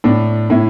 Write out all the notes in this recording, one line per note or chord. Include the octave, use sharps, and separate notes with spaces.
A2 D4
A2 E4